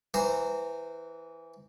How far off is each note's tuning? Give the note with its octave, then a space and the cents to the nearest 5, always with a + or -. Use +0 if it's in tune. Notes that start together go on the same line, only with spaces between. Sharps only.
E3 +0 C5 -15 A#5 -20